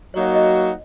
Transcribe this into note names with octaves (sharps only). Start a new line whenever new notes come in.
F#3 A#3 D#4 F#4 C#5
D#5